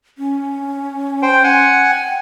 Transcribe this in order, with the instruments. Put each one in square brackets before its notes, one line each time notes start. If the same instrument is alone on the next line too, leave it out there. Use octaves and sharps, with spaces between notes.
[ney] C#4
[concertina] C5 G5
F#5 G#5
[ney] G5